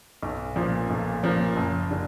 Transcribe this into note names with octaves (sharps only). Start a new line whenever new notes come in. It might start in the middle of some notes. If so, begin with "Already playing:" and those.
B1
A#2 F3 A#3
B1
A#2 F3 A#3
F#1
D3